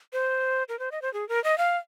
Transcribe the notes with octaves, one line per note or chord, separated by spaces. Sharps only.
C5
A#4
C5
D#5
C5
G#4
A#4
D#5
F5